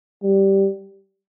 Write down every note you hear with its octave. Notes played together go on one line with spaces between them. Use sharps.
G3